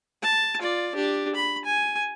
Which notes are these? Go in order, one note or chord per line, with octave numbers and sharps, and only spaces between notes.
A5
F4 D5
D4 G4
B5
G#5